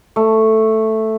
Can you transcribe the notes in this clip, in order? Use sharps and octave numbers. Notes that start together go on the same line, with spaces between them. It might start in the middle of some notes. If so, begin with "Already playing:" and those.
A3